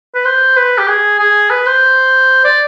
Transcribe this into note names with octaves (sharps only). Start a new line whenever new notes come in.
B4
C5
B4
G4
G#4
G#4
B4
C5
D5